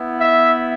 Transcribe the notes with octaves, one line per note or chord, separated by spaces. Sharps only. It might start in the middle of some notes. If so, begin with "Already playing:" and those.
Already playing: B3 E4
E5